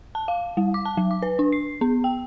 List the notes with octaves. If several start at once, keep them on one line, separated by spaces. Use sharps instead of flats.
A5
F5
G3
D6
A5
F#3
D6
B4
D4
C7
B3
G5